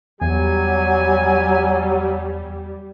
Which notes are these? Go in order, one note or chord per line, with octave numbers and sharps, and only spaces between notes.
E2 F#3 G3 G4 G#5